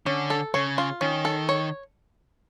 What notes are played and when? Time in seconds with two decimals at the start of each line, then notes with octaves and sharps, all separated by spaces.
0.06 D3 C#4
0.30 A4
0.54 C#3 C#5
0.78 F4
1.01 D#3 C#4
1.25 A4
1.49 C#5